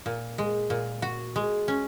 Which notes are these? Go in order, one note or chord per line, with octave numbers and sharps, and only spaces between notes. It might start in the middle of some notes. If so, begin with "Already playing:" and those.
A#2
G#3
A#2
F#4
G#3
C#4